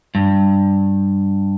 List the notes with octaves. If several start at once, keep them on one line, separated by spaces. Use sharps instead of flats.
G2